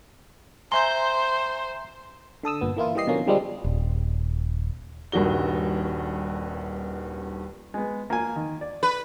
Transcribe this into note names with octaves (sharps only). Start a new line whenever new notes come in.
C5 E5 G#5 A#5 C6 G6
D3 A4 D#6 E6
G1 A#2 B3
E3 A#3 E4 F4
E3 G3 G4 D#5 C7
B2 D3 F3 A#3 C#4
D3 F3 G3 G#3 C4 D4
D#1
D#1 G2 D#3 F#4 G7
G#3 B3
A#3 F4 G#5
D#3
D5
B4